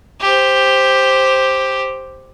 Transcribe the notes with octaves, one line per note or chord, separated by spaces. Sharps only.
G4 C5